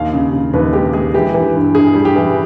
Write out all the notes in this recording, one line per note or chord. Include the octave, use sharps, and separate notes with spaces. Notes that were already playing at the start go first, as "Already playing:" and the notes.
Already playing: D#2 F5
C#3
C#3
D#2 B4
G#3 G4
G#3 G#4
E3 G4
E3
G2
G2 G#4
G3
G4
E3